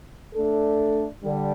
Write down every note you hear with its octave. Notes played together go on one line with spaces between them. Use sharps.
A3 D4 A4
D3 G3